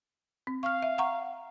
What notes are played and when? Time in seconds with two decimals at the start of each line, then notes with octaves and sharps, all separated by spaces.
0.47 C4
0.63 F5 C#6 F6
0.82 E5
0.98 F#5 A#5 C#6